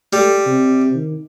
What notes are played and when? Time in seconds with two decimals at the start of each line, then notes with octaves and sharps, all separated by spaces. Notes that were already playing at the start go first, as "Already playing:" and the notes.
0.13 G3 A3
0.46 C3
0.95 D#3